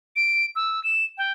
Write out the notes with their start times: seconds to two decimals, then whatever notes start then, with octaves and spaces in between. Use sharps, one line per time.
0.16 D7
0.56 E6
0.84 E7
1.18 G5